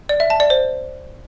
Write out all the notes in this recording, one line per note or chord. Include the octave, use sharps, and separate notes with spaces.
D5
E5
A5
D5
C5